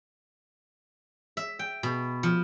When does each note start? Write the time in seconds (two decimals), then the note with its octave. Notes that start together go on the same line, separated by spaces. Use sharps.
1.37 E5
1.59 G5
1.83 B2
2.23 F3